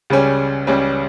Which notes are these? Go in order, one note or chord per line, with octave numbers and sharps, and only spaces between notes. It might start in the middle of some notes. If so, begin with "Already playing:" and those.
C#2 C#3 G3 C#4
C#2 C#3 G3 C#4